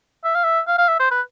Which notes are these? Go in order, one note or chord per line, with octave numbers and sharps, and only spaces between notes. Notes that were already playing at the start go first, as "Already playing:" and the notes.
E5
F5
E5
F5
F5
E5
C5
B4